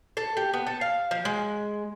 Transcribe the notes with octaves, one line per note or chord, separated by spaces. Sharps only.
A4
G4
B3
A4
F5
F3
G#3